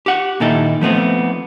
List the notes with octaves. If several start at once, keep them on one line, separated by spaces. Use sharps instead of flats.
G4 F#5
A#2 D#3 D#4 E4 A4
F3 A3 B3 C4